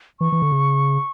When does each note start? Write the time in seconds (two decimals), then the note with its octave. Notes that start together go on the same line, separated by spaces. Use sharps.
0.20 E3 C#6
0.32 E3
0.42 D3
0.51 C#3